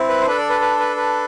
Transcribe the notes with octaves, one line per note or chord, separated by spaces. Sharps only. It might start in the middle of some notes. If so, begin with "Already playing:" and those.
Already playing: C4 E4
B4
C5
D4 A4 B4
D5
B4
B4
B4
B4